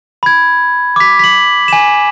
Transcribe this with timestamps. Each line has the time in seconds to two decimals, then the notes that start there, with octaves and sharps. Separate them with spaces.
0.23 B5 G#6
0.96 D6 B6
1.19 B6 F#7
1.68 G#5 E7